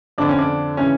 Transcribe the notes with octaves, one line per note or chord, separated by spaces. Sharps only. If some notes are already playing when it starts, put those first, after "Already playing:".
F2 D3 D4
C#4
D4
C#3 E3 C#4